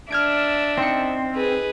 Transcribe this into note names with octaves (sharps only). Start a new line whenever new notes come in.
D4 E5 F6 G#6 D7
C4 D#4 C#7
G#4 B4